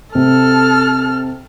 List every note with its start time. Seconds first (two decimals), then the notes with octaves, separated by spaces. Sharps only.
0.15 C3 A4 F6